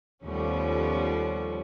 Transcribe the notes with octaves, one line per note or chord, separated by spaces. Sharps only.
D#2 F3 G3 A3 B3 C#4